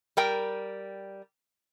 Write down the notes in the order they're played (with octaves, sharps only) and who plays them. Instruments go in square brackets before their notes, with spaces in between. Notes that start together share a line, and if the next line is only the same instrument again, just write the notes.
[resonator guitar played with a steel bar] G3 A#4 G5